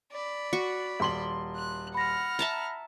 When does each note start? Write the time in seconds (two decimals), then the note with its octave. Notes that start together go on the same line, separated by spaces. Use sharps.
0.12 D5 B5
0.53 F#4 C#6
1.00 D#1 C6 F#7
1.56 F#6
1.94 F#5 B5 F6 A#6
2.39 E5 A5 A#5